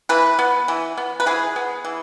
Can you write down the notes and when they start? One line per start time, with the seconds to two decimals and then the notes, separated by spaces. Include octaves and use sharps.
0.09 E3 B4
0.39 B3
0.68 E3
0.97 B3
1.20 B4
1.26 E3 G#4
1.56 B3
1.85 E3